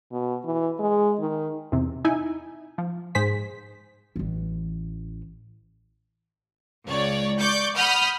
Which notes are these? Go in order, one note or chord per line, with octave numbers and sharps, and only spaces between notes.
B2
E3
G#3
D#3
E2 C3
D#4 E4 G#5
F3
G#2 G#4 C5 B6
A1 E3
C#2 C#5 D5
D5 C#6 D6 G6
F#5 B5 D#6 F6 G6